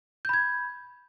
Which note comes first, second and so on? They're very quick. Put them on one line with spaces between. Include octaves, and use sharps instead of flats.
G6 B5 G#6